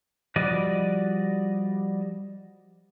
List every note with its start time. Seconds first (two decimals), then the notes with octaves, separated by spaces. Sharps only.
0.36 F3 G3 F#4 D5 D#5